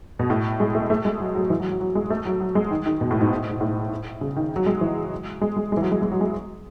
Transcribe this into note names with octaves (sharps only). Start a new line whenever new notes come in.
B2
A2
G#3
A3
A3
G#3
F#3
F#3
E3
F#3
F#3
F#3
G#3
A3
F#3
F#3
G#3
D#3
D#3
B2
A2
G#2
G#2
A2
C#3
D#3
F#3
G#3
E3
G#3
G#3
G#3
E3
F#3
G#3
G#3
F#3
G#3